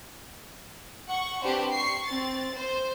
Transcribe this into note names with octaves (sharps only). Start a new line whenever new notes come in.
F#5 C#6
C4 D4 G4 B4 C5
C#6 C7
C4 A6
C5